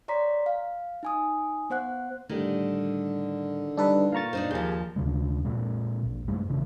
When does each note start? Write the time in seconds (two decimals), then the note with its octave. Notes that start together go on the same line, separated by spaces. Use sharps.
0.08 C#5 D5 A#5 C6 B6
0.46 F5
1.03 D#4 G#5 D#6
1.70 B3 C5 F#5 F#6
2.29 A2 D3 D#3 G3
3.77 G3 D4 D#4 A4 B4
4.12 A#2 F5 A#5 C#6 A6
4.33 D4 D#4 C5
4.51 D#2 F3 G4 G#4 A5 G6
4.96 D2 D3 G#3
5.44 A#2 G#3 C4
6.06 A#1
6.27 G2 G#3 A3
6.49 A#1 C#3 E3